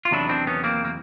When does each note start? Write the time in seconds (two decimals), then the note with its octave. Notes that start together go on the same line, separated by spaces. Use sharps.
0.05 F4
0.11 E2 C3 D#3 F#3 D4 E4
0.29 C4 D4
0.47 B3 C#4
0.64 A#3 C4
0.85 A#3